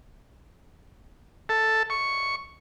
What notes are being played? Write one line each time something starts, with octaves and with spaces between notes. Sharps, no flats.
A4
C#6